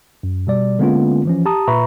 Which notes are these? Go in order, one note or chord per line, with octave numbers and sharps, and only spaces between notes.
F#2
B2 G3 D5
D3 G#3 A#3 B3 C#4 F4
E3 F3 C#4
G4 A5 A#5 D#6
A#2 B4 E5 A#5 B5 C#6